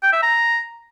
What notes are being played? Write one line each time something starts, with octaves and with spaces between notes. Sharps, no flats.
G5
E5
A#5